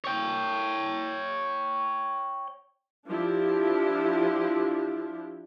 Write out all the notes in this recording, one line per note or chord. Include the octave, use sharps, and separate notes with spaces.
C#5 G5
F3 D4 E4 G4